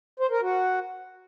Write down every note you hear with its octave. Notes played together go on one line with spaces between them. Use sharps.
C5
A#4
F#4